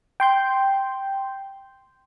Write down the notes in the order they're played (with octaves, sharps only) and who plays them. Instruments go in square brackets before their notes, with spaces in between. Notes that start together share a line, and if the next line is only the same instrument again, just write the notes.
[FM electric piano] G5 C6 G6